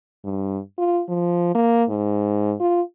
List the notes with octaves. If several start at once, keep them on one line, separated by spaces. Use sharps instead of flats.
G2
F4
F3
A#3
G#2
F4